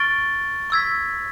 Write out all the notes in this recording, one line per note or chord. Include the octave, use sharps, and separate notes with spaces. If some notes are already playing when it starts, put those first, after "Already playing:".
Already playing: C#6 F6 A6 D7 G7
C#6 E6 G#6 B6